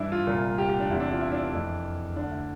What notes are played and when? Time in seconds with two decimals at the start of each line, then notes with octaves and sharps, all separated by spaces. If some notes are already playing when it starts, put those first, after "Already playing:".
Already playing: G2 E3 D4 E4
0.12 F4
0.27 C2 A#2
0.58 G4
0.69 G4
0.80 D4
0.90 E2 C3 E3 E4
1.00 D4
1.12 F4
1.21 E4
1.32 D4
1.43 D4
1.52 F2 E3
2.16 D2 D3 D4
2.31 E4